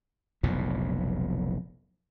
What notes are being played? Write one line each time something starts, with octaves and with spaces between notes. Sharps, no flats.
F1 B1 F2 A#2